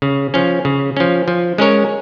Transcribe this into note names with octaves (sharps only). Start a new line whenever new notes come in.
C#3
F3 C#4
C#3
F3 C#4
F3
G#3 C#4 A#4 C#5